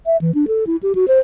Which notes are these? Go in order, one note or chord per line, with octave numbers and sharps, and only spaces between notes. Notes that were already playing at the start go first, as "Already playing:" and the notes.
E5
E3
D4
A4
E4
G4
F#4
C5